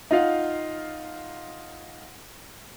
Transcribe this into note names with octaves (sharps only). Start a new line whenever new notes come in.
D#4 F4 F5 F#5